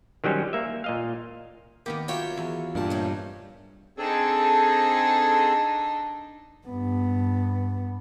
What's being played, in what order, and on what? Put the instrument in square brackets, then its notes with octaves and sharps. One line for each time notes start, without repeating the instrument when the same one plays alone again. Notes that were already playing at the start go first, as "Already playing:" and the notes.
[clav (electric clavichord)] D#3 F#3 G3 C#4 C5
A#3 E5
A#2 D#5 F5
[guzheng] D#3 B3 G4 [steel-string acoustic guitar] A#3
[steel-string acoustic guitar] F#3 F4 [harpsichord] C#5 E5 G5
[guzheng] E2 B3
[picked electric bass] G2 [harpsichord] A#2 A5
[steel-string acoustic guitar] C3 D#3 C#4
[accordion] C4 G#4 A4 [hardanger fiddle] D4 D#4
[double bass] G2 B3